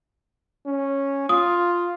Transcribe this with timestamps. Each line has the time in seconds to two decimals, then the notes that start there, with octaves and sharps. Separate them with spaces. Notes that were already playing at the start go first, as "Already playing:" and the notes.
0.66 C#4
1.29 F4 D#6